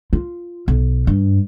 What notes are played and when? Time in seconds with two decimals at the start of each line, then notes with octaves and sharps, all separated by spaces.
0.13 F4
0.68 B1
1.07 G2